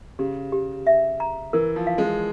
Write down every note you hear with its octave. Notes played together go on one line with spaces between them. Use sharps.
C#3 G4
G4
E5
A#5
E3 A#4
F3
F5
G#3